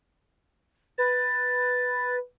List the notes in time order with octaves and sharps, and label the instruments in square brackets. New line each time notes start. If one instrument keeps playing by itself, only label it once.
[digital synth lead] B4 [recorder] A6